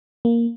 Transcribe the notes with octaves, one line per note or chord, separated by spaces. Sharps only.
A#3